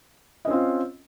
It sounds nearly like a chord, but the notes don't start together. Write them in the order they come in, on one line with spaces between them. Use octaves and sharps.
D#5 C#4 C4 F4